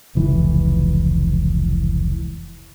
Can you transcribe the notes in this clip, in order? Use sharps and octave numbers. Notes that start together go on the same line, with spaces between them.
F1 C#2 E3